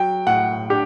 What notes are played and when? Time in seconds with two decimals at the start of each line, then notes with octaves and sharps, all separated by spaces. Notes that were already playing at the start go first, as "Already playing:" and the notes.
Already playing: F#3 G5
0.27 A2 F#5
0.70 D4 G4